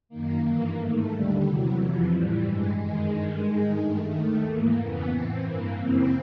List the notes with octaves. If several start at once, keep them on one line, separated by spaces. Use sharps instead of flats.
F#2 D#3 A#3
G2 E3 A#3
G#2 D#3 A3
D#2 D3 G3
E2 C3 E3 F#3
F2 C3 E3 F3
A2 E3 G3
G2 E3 G#3
F#2 D#3 G#3
G2 D#3
G#2 D#3
G2 D#3 A3
D#2 D#3 A3
G#2 E3 A#3
F2 C#3 E3 B3
A2 E3 C4
G2 E3 A#3
F#2 C#3 E3 C4